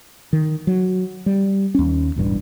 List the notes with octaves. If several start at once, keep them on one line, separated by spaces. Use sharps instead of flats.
D#3
F#3
G3
D#2 C#4
E1 A1 G2